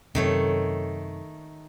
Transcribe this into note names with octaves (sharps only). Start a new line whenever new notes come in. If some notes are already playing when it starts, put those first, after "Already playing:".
F#2 C3 D#3 A3 C#5